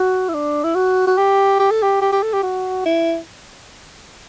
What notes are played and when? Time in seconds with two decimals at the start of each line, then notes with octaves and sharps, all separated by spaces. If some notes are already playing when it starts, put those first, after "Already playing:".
Already playing: F#4
0.29 E4
0.34 D4
0.64 E4
0.75 F#4
1.07 F#4
1.17 G4
1.59 G4
1.71 A4
1.82 G4
2.01 G4
2.12 G4
2.23 A4
2.33 G4
2.43 F#4
2.85 E4